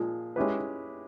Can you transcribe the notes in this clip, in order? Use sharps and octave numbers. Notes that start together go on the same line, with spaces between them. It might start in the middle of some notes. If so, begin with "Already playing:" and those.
Already playing: A#2 F3 G#3
G#3 C#4 E4 G4 B4